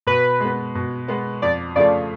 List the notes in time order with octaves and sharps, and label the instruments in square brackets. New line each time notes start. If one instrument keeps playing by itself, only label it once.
[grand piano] B2 [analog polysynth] B4
[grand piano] G#3 B3
B2
G#3 B3
[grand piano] F2 [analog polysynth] D5
[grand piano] C#3 F3 A3 F4 [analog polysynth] D5